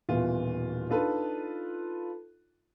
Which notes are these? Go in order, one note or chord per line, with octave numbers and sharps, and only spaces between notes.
D#1 B2 E3 F4
D4 D#4 F4 A4 B4